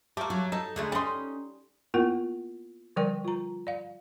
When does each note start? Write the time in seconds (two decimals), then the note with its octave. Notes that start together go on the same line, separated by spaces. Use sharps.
0.17 A3 A#3 G4
0.30 F#3
0.52 D#4 A4
0.76 D3 G#3 A3
0.92 G3 C#4 D#4 C6
1.94 A#3 B3 E4 F4 A#4 F#5
2.96 D3 F3 G3 A#4 D5 G5
3.25 F4 A#5
3.67 D5 F5